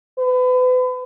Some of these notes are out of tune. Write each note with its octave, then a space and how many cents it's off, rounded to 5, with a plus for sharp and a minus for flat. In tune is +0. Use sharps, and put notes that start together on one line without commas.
B4 +35